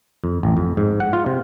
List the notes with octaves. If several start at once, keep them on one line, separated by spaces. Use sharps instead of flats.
F2
A1
F2
G#2
F#5
F4
C3